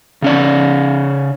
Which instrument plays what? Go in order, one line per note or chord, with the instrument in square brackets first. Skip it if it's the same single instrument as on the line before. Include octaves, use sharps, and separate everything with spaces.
[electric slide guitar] C#3 C#4 D5